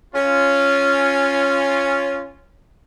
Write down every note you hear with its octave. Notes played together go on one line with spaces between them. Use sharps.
C#4 F4